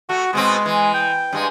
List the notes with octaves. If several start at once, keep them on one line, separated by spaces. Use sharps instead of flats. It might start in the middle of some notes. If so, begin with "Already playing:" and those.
A3 F#4
B2 G#3 B3 C4
E3
G5
G2 G#3